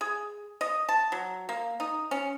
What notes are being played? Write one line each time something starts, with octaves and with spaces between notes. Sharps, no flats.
G#4
D#5
A5
F#3
A#3
D#4
C#4